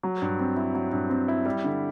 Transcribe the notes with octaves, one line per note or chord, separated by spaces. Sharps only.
F#3
G2
C4
E4
F#3
G2
C4
E4
G3
D3